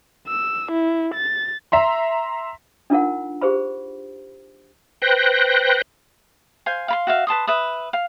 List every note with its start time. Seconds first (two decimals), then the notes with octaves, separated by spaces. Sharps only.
0.27 E6
0.72 E4
1.14 A6
1.72 E5 A#5 C6
2.90 D4 D#4 F4 A#4 F#5
3.41 G4 G#4 C5 B5
5.02 B4 C5 G5 F#6 A#6
6.66 C5 F5 G#5
6.88 F5 B5 C6
7.07 F#4 E5 F5
7.27 B4 A5 C6 D#6
7.47 B4 E5 D#6
7.93 F5